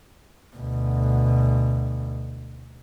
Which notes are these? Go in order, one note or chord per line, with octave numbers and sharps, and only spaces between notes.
D2 B2